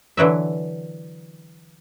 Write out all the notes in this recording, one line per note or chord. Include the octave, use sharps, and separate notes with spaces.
D3 E3 F#3 E5